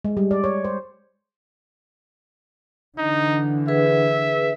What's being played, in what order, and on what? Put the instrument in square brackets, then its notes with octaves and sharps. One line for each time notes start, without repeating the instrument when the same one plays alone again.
[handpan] G#3
G3
D5
C#5
C5
[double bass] D3 E3 [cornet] D#4
[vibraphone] G#4 B4 [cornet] E5